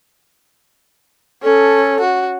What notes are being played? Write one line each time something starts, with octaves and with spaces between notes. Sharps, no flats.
C#4 A4
F#4